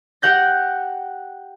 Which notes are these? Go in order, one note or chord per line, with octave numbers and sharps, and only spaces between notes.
G4 F#5 G6 A#6